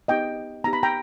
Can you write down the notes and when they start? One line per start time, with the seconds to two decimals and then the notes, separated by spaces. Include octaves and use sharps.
0.08 B3 D#4 G4 D#5 G5
0.64 B3 D#4 G4 A#5
0.73 B5
0.83 G5 A#5